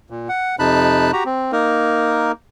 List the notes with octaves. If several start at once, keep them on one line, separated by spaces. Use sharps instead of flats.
A#2
F#5
F2 C3 D#4 A5 B5 F#6
F#4 G4 A#5
C4
A#3 D#4 A#4